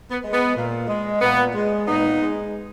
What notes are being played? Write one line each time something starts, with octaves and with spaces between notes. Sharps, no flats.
B3
G#3
B3
A#2
G#3
A#2 B3
G#3
A#2 B3 D#4
G#3